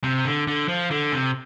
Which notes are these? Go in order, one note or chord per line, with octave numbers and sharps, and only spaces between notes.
C3
D3
D3
F3
D3
C3